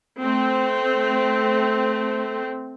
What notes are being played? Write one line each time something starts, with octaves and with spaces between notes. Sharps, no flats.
A3 C4